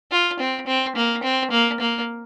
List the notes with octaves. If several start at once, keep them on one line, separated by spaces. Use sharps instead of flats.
F4
C4
C4
A#3
C4
A#3
A#3